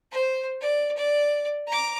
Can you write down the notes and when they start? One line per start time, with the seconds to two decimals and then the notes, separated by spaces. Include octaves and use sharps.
0.12 C5
0.61 D5
0.97 D5
1.67 A#5 D6